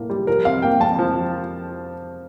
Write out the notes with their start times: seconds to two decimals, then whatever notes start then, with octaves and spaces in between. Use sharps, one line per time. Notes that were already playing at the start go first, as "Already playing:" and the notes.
Already playing: A2 A#3
0.10 G3
0.27 F3 A#4
0.45 C3 F5
0.62 A#3 G5
0.80 F2 A5
0.99 F3